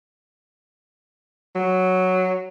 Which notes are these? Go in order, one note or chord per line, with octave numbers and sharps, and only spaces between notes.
F#3